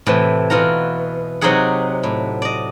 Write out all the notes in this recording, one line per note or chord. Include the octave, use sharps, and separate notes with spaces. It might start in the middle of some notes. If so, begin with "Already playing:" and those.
A2 C3 E3
B2 E3 F4 F#5 A#5
C3 F#3 D#4 F#4 G#4 F#5
A2
D5 D#5